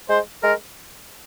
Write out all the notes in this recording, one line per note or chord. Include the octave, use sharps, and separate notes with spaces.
G#3 C5
G#3 A#4